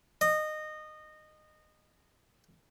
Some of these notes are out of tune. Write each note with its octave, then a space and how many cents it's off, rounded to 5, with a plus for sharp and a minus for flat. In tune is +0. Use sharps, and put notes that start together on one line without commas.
D#5 -20